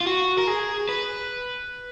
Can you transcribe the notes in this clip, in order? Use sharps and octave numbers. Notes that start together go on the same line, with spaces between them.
F4
F#4
A#4
G#4
B4